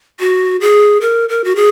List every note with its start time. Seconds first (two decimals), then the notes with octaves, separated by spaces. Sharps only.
0.20 F#4
0.61 G#4
1.01 A#4
1.29 A#4
1.44 F#4
1.56 G#4